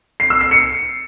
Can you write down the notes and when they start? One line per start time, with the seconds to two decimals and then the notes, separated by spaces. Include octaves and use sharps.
0.20 C7
0.30 E6
0.41 C7
0.51 C#7